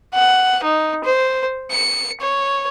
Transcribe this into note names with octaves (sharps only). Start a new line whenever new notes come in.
F#5
D#4
C5
C#7
C#5